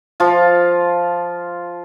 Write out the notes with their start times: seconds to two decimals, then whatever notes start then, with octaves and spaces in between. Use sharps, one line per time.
0.20 F3 F4